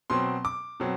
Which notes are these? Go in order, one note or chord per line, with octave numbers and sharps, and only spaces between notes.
B2 F#3 C4 C6
D6
B2 F#3 C4